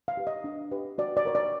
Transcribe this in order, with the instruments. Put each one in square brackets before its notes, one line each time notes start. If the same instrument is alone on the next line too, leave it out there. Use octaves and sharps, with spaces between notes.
[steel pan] F5
G4 B4
D#5
D4
G4 B4
F#4 D5
D5
A#4 C#5
D5